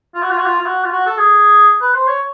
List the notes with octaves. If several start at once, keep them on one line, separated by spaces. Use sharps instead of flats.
F4
F#4
F4
F#4
F4
F4
F#4
F4
F#4
A4
G#4
B4
C5
C#5